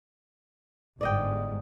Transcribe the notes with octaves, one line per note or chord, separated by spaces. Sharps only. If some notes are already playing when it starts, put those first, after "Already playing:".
G1 G#2 D5 D#5 G5